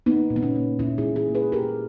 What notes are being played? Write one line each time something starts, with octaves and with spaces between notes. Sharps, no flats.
A#3 B3 D#4
A#2
B3
C#4
A#3
A#2 C#4 E4
E4 G#4
A#2
E4 G#4
A#3
G#4 B4
A#2 G4 A#4